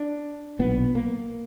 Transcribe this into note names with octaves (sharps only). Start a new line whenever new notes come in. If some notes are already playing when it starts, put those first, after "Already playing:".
Already playing: D4
B1 A#2 B3
A#3